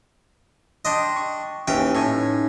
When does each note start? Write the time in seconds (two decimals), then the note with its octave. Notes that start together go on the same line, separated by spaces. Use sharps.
0.85 D4 D#5 G5 C6
1.16 C#6
1.68 D#2 E3 C#4 G5
1.95 A2 D#4 C#5 G#5